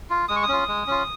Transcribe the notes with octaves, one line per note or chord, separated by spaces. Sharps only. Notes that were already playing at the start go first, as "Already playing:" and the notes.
F4
G#3 D#6
C#6
D#6
C#4 F4
G#3
C#4 F4